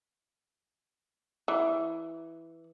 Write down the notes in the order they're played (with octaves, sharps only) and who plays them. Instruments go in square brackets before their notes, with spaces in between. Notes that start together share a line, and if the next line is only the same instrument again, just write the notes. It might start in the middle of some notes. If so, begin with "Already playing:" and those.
[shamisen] E3